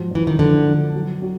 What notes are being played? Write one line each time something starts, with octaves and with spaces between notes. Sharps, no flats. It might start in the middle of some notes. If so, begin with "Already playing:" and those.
Already playing: G#2 F3 F#3
E3 F3
D#3
D3 F3
F3
F#3
F#3